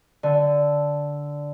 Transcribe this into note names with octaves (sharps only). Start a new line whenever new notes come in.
D3